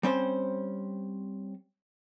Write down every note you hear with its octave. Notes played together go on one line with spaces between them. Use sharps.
G3 C4 C#4 C5